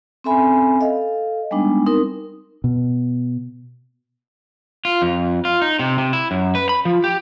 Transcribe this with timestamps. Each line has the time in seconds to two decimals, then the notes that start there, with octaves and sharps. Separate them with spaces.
0.24 C4 C#4 A4 E5 G#5 B5
0.81 A4 D#5 F5
1.51 G3 G#3 B3 D4 D#4
1.86 C4 D#4 A#4
2.64 B2
4.85 F4
5.02 F2
5.45 F4
5.62 D#4
5.79 C3
5.98 C3
6.13 E4
6.31 F#2
6.55 B4
6.69 B5
6.85 F3
7.04 G4